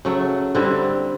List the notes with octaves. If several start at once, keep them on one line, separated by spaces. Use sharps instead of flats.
C#3 F#3 A3
D3 G3 C4 E4